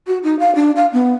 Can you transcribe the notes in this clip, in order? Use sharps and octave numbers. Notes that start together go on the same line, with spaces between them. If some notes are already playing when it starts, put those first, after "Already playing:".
F#4
D#4
F5
D4
F5
B3